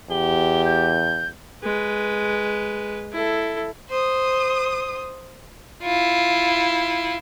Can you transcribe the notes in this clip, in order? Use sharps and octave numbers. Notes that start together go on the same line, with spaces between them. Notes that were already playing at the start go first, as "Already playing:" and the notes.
E2 G4 G7
G6
G#3 B4
E4 A4
C5 D#6
E4 F4